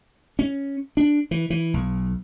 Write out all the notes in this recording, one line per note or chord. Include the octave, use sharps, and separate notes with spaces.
C#4
D4
E3
E3
B1